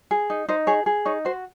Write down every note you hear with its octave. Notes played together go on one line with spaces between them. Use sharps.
G#4
D#4
D#4 C5
G#4 C#5
G#4
D#4 C#5
F#4 C5